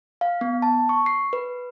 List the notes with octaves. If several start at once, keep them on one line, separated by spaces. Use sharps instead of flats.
F5
B3
A5
C#6
C7
B4